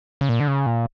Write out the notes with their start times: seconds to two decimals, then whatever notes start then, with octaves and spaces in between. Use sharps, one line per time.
0.21 C#3
0.29 A#2
0.40 D3
0.48 C#3
0.66 A#2